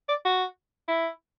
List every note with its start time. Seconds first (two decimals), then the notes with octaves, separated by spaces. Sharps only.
0.09 D5
0.25 F#4
0.88 E4